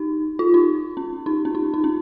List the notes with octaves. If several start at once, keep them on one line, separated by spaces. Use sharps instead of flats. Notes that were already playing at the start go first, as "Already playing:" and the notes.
Already playing: D#4
F4
D#4
C#4
D#4
C#4
D#4
D#4
C#4